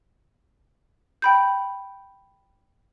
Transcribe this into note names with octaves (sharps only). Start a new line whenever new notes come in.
G5 B5 G6